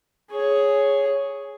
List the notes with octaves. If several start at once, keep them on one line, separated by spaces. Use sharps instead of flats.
G#4 C#5